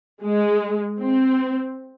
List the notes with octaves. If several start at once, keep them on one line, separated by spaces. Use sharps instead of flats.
G#3
C4